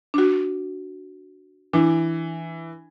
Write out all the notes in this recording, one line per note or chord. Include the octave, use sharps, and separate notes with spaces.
D4 F#4
E3 D4